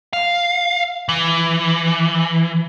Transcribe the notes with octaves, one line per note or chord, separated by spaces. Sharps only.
F5
E3